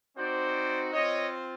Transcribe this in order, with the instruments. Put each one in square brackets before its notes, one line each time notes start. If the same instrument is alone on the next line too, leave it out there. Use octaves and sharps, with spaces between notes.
[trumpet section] C4 D#4 F#4 C5 D5
C4 F4 C#5 D#5